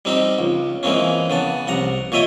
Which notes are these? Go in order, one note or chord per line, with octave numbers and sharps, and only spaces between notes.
G3 C4 D#4 G4
C#2
E3 G#3 A#3 C4 C#4
C#3 B3 A5
C2 F#5 A#5
A#2 C#5 D#5 E5 G5 D#6